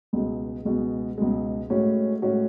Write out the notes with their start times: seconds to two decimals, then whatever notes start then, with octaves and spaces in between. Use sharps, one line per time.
0.13 C#2 B2 G#3
0.65 C#2 B2 G#3
1.18 C#2 B2 G#3
1.70 A2 G#3 C#4 F#4
2.22 A2 G#3 C#4 F#4